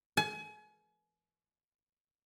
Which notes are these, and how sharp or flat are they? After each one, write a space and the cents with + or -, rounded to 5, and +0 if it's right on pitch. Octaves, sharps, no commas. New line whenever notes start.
G#5 +35